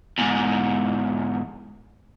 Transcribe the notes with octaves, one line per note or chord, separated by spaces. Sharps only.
E2 G#2